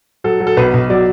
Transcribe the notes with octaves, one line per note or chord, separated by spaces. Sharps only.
F#3 A4
F#3
A4
B1 B4
B1
F#3 D5